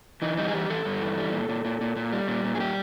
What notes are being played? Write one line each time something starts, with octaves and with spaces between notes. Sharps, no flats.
E3 D#4
G3 D#4
G#4
E3 G4
E3 A4
G2
E3
G3
A#2
A#2
A#2
A#2
A#2
G3
A#2
A#2
G#4
G3 G4